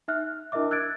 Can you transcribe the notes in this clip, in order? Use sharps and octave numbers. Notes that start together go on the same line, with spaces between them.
D#4 E5 F6 F#6
D4 E4 A#4 D#5 E5 D6
E6 F#6 G#6 A6 D7